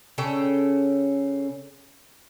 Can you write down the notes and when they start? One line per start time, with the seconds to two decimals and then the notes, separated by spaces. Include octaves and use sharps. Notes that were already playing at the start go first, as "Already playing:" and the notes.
0.18 C#3 C#4 A4 G5